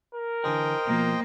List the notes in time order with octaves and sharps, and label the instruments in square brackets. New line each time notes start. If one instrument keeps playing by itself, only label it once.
[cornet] A#4
[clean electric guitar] D3 E3 G#4 [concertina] C5 D#5 G5
[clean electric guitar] B2 F3 [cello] A#3